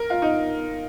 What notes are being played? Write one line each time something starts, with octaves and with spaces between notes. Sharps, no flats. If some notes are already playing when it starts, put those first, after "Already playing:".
Already playing: A#4
F4
D#4